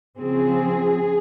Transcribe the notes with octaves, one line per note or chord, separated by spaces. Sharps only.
C#3 F3 C4 G#4